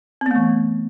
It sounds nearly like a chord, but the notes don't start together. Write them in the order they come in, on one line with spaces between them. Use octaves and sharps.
C4 B3 A3 E3